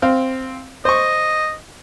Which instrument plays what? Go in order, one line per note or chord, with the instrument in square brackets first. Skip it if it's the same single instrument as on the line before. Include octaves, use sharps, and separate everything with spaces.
[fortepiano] C4 F5
[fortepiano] C5 C#6 [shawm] D#5